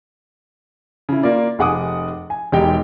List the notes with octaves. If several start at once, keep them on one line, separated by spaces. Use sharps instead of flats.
C#3 E4
A#3 F4 D5
F1 G#4 F#5 D6 D#6
G#5
E1 G#3 D#4 G4 G5